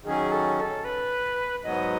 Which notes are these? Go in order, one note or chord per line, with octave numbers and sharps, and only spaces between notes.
D#3 F#3 C#4 G#4
A4
A4
B4
G#2 F#3 B3 D#5